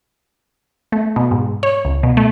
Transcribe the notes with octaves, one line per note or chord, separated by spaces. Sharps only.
A3
B2
G#2
C#5
C#2
B2
A3